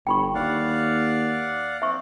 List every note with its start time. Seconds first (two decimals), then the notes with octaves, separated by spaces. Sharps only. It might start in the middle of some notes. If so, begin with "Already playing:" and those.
0.07 G1 G5 B5 C#6
0.35 D#2 D5 F5 F#5
1.82 C4 E5 C#6